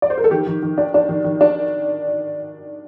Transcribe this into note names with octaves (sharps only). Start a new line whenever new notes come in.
D5
C5
A#4
A4
D#3 G4
D#3
D#3
D4
D4
D#3
D#3
D4